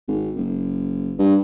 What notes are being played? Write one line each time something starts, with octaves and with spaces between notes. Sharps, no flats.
G#1
F#1
G2